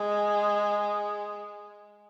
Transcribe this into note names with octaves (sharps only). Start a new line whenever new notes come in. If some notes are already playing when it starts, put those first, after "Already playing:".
Already playing: G#3